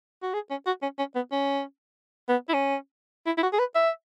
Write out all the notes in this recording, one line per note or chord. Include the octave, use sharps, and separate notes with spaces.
F#4
G#4
C#4
F#4
C#4
C#4
B3
C#4
B3
E4
C#4
E4
E4
F#4
G#4
B4
E5